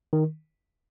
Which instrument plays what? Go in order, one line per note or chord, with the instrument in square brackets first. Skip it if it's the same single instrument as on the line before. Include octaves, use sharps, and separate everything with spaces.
[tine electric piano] D#3